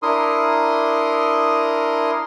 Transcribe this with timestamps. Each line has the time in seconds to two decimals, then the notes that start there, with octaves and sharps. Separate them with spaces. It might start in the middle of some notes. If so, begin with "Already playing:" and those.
0.02 D4 E4 A#4 C6 D#6